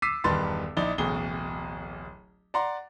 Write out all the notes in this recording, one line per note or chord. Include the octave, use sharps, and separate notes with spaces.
D6 E6 B6 C7 D#7
E1 G2 D#3 B4 C6 A6
A#1 D#4 E4 D5 G7
D1 A1 B2 G#4 G7
D5 F#5 A#5 C6